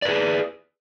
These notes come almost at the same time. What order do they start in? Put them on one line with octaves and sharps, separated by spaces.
D5 B4 G#4